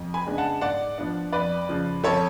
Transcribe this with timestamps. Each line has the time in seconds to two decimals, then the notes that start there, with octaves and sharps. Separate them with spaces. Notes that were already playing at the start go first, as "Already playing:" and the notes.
Already playing: F2
0.14 G#5 B5
0.27 C#3 G#3 B3 D4
0.38 F#5 A5
0.61 G#2 D5 F#5
0.98 F3 B3 D4
1.33 F2 B4 D5
1.69 C#3 F3
2.03 F2 A4 C#5